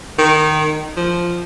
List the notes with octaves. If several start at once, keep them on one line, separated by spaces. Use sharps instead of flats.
D#3
F3